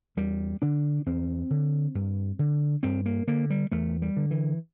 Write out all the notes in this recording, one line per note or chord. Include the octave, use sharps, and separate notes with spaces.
E2 G3
D3 D4
E2 C4
D3
G2
D3
G2 C4
A#3
D3 A#3
G3
E2 A3
G3
D3
E3